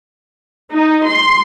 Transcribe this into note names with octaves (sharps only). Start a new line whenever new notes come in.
D#4
C6